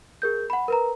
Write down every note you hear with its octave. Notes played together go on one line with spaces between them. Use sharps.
G#4 A#4 G6
F#5 B5
A#4 B4 A#5